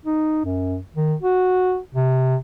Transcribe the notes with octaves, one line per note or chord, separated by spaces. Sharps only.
D#4
F#2
D#3
F#4
C3